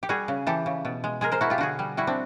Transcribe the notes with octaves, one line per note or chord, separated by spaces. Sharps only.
G4
G3 F#4 G#4
C#3
E3 G4 A4
C#3
B2
G#3
G#3 G#4 A#4
A#4 C5
B2 E4 F#4
F4 G4
D3 F#4 G#4
G3
G3 E4 F#4
C4 D4